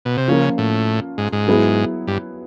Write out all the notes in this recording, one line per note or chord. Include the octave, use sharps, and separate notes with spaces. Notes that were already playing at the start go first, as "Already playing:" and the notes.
B2
C3
C#3 F3 A#3 C#4 F4 A#4
A2
G#2
G#2
F#3 B3 E4 G#4
G2